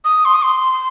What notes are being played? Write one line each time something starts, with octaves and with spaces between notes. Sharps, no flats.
D#6
C6
D#6
C6